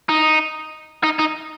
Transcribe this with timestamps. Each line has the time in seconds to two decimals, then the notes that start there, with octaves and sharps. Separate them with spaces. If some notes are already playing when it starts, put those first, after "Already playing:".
0.09 D#4
1.04 D#4
1.19 D#4